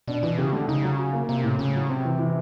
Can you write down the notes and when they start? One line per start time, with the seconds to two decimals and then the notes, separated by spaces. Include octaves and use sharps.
0.07 B2 D4
0.23 B2 E3
0.38 C#3 G4
0.53 D3 A3
0.68 C#3 D#4
0.83 F#3
0.98 F#4
1.13 A#3
1.29 C3 A#3
1.44 A2
1.59 A2 C#3
1.75 F#3
1.89 C3 C4
2.05 E3
2.19 E3